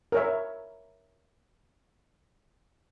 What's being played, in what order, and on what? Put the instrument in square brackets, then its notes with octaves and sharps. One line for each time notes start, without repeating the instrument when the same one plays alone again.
[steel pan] A#4 C#5 E5